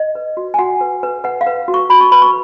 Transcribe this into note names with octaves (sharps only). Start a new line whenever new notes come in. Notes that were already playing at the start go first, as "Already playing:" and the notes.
Already playing: D#5
B4
F#4
G#5
F#4 F#5
B4
B4
B4 F#5
F5
B4
F#4
C#6
F#4 B5
C#6
B4 B5
C#6